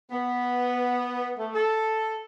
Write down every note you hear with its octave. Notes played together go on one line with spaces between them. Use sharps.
B3
A3
A4